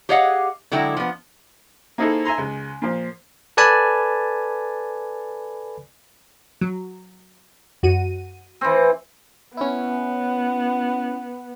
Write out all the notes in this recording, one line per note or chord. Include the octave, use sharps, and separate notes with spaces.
G4 G#4 C#5 D#5 F5 F#5
D3 F#3 G#3 E4 G5
F3 B3
A#3 C4 D#4 E4 G#4 A4
E5 G#5 A#5 C6
C#2 G#3
A#2 F3
A4 B4 D5 G#5 A5 B5
F#3
F#2 F#4 D#7
E3 C4
B3 C#4 E4